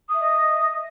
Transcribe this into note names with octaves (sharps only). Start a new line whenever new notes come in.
D#5 E5 D#6